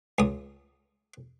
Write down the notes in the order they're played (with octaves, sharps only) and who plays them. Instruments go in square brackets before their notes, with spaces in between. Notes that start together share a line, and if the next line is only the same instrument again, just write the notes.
[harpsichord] C#2 D#6